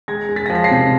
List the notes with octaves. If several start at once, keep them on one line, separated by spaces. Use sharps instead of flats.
G#3 G#6 A#6
G#3
A6 B6
F3 A#6
B6
A#6 C7
C3